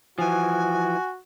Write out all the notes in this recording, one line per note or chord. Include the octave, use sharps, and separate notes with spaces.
E3 F3 F#4 G#5